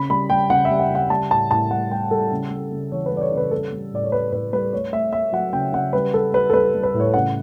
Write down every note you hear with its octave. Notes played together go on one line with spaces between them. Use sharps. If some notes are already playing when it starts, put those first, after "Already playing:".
Already playing: C#3 B5
G3 B5
G3 G5
C#3 F#5
E5
G3
F#5
C#3 F#5
G3 A5
A2 A5
A2 A5
G3 F#5
G3 G5
G3 A4
C#3
G3
C#3
E3 C#5
B4
G3
D5
C#5
C#3
B4
G3 A4
G3
A2 D5
C#5
G3 B4
A2 B4
G3 B4
A3 C#5
A3 E5
A3 E5
F#3 F#5
C#3 G5
C#3 F#5
G3 B4
G3 A4
G3 B4
A4
G3 B4
G3
B4
A2
C#5
C#3 F#5